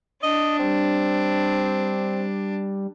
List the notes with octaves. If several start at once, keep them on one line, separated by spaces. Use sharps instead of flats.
D4 D#5
G3 C4